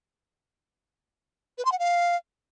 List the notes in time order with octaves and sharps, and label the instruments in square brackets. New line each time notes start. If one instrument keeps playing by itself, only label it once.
[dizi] B4
C6
F#5
F5